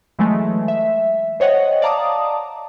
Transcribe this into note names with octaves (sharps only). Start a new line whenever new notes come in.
E3 F#3 G#3 A3
E5
C5 C#5 D#5 F#5 G5
D5 F5 A5 A#5 D6 D#6